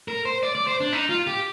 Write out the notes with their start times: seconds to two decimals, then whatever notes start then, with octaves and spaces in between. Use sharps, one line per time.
0.08 A#4
0.25 C5
0.43 D5
0.55 D5
0.67 C5
0.80 D4
0.92 D#4
1.09 F4
1.27 G4